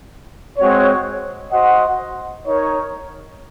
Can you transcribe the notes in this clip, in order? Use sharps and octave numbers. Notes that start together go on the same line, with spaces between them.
G#3 C4 F#4 C#5
F#4 C5 D#5 F#5
D#4 A#4 C#5